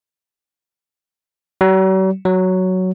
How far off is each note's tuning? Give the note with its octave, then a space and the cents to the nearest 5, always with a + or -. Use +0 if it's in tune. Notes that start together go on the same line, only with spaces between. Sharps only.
F#3 +45
F#3 +5